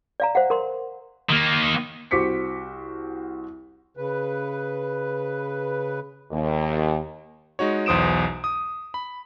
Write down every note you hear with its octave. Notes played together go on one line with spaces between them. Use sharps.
D5 F5 A#5
C5 F5 F#5
A#4 C6
D#3 A#3
C2 F#4 C5 D6 B6 C#7
C#3 B4
D#2
G#3 D#4 F#4 C#5
B1 E2 C5 D#6 D7 E7
D#6
B5